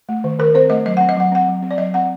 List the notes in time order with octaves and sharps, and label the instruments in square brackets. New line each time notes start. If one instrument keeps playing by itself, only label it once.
[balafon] A3
D#3
D#3 A#4
C4 C5
A3 D#5
F#3 D#5
F#5
C4
D#5
F#3 F#5
C4 F#5
F#3
C4
D5
F#3 D#5
C4 F#5